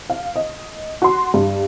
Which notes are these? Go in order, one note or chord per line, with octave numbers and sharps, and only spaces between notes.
F5
D#5
F#4 C6
G2